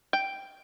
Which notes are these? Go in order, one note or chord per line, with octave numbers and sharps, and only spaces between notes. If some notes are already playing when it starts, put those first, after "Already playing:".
G5